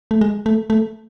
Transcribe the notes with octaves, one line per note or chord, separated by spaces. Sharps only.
A3
G#3
A3
A3